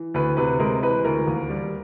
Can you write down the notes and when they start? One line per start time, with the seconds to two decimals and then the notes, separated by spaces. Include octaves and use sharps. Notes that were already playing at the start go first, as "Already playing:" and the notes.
Already playing: E3
0.14 D2 B4
0.37 C3 B4
0.60 G#3 A#4
0.83 E3 B4
1.05 D2 A#4
1.27 D#2
1.49 G3